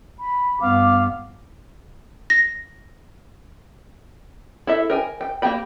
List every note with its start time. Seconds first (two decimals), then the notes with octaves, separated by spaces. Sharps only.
0.20 B5
0.60 G2 B3 F5 D6
2.30 A#6
4.67 E4 A4 E5
4.90 A#4 G5 G#5
5.21 G5
5.42 A#3 G4 G5 B5